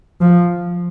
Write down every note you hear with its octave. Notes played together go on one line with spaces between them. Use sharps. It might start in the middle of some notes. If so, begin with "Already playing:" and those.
F3